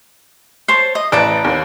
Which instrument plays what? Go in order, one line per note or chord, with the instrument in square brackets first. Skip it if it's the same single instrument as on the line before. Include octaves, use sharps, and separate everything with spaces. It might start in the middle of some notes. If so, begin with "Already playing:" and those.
[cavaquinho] C5 C#5 A5
D#5 D#6
[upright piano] A1 D5 D7 [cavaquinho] B4 A5 A#5
[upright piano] D#2